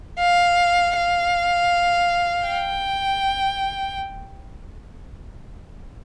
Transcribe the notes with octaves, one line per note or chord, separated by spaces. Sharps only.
F5
F5
G5